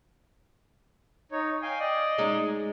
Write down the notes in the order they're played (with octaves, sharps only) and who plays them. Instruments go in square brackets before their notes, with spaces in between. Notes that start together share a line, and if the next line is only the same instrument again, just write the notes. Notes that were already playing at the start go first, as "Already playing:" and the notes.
[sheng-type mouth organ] D#4 C#5
F5 G5 G#5
D5 D#5
[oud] G#3 C#4 D#4